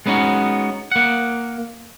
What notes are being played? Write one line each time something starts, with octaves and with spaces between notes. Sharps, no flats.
G#3 B3 C#4 D#4 F#4
A#3 F#5